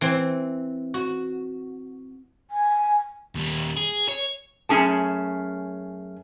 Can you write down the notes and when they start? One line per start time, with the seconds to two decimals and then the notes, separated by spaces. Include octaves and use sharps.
0.01 E3 C4
0.94 F#4
2.51 G#5
3.35 D#2 G3
3.78 G#4
4.09 C#5
4.69 F#2 A3 C#4 G#4 A5